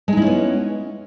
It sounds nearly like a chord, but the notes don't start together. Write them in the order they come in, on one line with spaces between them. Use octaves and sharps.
G#3 D#4 E4 C#4 B3